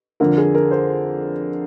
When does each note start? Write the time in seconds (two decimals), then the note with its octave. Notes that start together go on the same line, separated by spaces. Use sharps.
0.20 F2 D3 A#4
0.38 G#4
0.55 A#4
0.71 C5